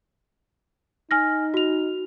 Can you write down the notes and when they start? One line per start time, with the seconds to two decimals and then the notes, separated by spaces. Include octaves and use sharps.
1.11 D#4 G#5 F6 A#6
1.54 F#4 F7